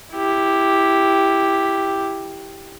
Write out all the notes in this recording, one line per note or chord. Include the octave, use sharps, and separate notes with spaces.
E4 G4